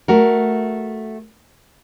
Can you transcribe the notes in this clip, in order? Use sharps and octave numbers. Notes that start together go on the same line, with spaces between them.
A3 F#4 A#4